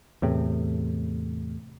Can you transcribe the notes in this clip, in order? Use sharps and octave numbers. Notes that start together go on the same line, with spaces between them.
E2 A2 C3